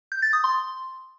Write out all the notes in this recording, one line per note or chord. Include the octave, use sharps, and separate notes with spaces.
G6
A6
D#6
C6